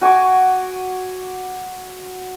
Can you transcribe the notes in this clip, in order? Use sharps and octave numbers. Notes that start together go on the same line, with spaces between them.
F#4 G#5 C#6 D6